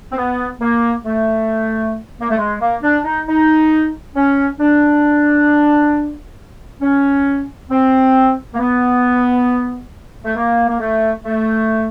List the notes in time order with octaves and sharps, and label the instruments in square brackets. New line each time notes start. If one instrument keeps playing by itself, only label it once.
[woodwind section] C4
B3
A#3
A3
A#3
A3
G#3
A#3
D4
D#4
D#4
C#4
D4
C#4
C4
A#3
B3
A3
A#3
A#3
A3
A3